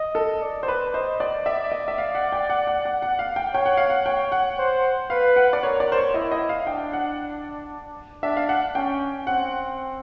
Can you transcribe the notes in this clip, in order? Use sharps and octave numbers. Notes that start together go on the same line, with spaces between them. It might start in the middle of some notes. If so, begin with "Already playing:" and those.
Already playing: D#5
A4
D5
C5
B4
C5 D#5
D5
D5 E5
D#5
E5
F5
F#5
G5
F#5
F#5
F#5
F#5
F5
G5
C#5 G5
F#5
F5
F#5
C#5 G5
F#5
C5
B4 F5
F#5
D5
A#4 C#5
D5
C5
C#5
E4 D#5
D#5
F5
D4 G5
F#5
D4 E5
F5
F#5
C#4 G5
C4 F#5